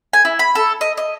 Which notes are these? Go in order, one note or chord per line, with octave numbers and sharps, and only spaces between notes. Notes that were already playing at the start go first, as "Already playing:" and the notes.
G#5
E4
B5
A4
D#5
D#5